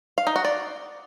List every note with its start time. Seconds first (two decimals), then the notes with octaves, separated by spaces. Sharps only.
0.18 F5
0.27 D#4
0.36 F#4
0.45 D5